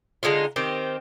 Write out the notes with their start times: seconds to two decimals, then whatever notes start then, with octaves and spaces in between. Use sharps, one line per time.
0.23 D3 G#3 D#4 F4
0.56 D#3 C4 G4